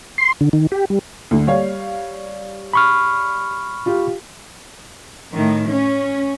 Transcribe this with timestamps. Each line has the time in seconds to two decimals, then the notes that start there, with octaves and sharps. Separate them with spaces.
0.18 C6
0.41 D3
0.53 D#3
0.72 G4
0.90 G3
1.31 D2 D3
1.47 G3 C#5 F5
2.73 B5 C#6 F6
3.86 F4 G4
5.33 A2 D#3
5.68 C#4